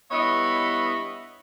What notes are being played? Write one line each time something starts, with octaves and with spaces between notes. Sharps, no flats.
G2 B3 E4 C#5 D#5